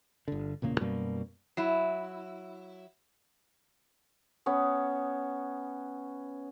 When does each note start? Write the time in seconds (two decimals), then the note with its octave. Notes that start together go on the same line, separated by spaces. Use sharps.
0.28 G1 D3
0.62 E1 A#2 C#3 A#3
0.80 F#2 B2 G3 A#3
1.57 F#3 E4
4.46 B3 C#4